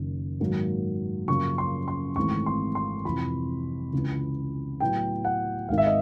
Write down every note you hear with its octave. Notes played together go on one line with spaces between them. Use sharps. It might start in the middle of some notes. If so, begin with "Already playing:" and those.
Already playing: F#1 F#2 D#3
G#2 D#3 F#3 A#3
F#2 C#3 F3 A#3 C#6
C6
C6
G#1 G#2 E3 A3 C4 C#6
C6
C6
F2 C3 E3 B5
C#2 C#3 E3
A2 F#3 B3 E4 G5
F#5
G#1 G#2 D#3 F5
E5
D#5